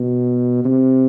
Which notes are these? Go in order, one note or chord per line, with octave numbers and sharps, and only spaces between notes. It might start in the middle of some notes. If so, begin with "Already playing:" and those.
Already playing: B2
C3